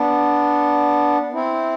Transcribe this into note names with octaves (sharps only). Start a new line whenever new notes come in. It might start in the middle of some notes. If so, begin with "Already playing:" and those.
Already playing: B3 D4
C4 E4